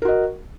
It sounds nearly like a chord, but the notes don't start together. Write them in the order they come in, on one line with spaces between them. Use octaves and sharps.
A#4 F#4 D#5